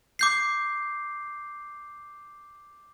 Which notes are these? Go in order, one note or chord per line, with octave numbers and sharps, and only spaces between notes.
D6 G6 C7